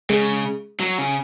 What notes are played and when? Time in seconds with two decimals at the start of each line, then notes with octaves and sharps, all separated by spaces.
0.10 C#3 G#3
0.80 F#3
0.98 C#3